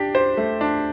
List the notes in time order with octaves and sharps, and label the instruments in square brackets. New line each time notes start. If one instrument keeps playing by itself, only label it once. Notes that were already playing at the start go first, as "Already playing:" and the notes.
Already playing: [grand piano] D4 G4
C5
A3
D4